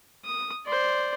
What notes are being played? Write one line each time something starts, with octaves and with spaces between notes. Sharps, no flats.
D#6
C5 D5